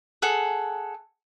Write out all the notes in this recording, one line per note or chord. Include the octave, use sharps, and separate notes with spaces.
G#4 A4 F#5